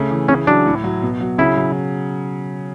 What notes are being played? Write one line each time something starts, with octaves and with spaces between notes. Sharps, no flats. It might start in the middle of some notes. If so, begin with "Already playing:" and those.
Already playing: C#3 A3
E3
C#3 C#4
F#3 D4
A2
F#3
B2
F#3
C#3 E4
F#3